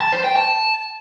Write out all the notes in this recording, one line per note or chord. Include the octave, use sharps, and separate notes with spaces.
A5
C5
G5
A5